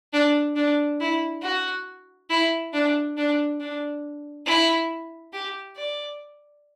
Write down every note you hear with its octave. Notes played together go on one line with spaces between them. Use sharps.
D4
D4
E4
F#4
E4
D4
D4
D4
E4
G4
D5